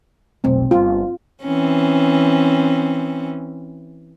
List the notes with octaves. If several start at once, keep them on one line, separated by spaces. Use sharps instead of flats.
F1 B1 C4
G1 F4
E3 C4 C#4